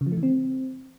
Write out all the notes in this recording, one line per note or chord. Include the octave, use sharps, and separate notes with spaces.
C#3
F3
A3
E3
C4